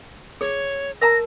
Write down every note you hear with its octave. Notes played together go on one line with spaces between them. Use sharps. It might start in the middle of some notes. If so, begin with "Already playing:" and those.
G#4 C#5
A#4 A5 A#5 A#6